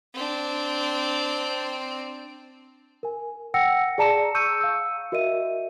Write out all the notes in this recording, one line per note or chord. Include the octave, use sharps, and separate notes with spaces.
C4 D4
A#4 G#5
F#5 G5 E6 A#6 C#7
G#4 D5 A5 A#5 C#7 E7
C#6 E6 G6 C#7 D#7
F5 E6
F#4 A#4 D#5 E5 D#7